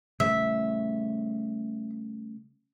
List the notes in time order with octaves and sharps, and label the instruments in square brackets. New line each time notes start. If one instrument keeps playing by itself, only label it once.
[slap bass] C#3 G3 A3 [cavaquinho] E5